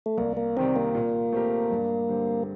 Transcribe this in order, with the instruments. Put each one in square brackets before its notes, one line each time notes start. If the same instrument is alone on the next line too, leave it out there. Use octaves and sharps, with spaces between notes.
[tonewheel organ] A3
[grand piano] C2 [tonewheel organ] A#3
[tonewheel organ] A#3
[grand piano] C3 D#3 G3 [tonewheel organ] C4
[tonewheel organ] A#3
[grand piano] A#2
A3 C4 G4 A#4
G2
D3 G3 C4